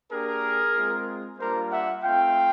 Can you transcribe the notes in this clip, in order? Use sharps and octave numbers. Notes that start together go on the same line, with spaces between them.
A#3 D4 G4 G#4 A#4
G#3 C4 F4
G3 A#3 D4 F4 A#4 C5
E5 F#5
A3 C4 F4 F5 G5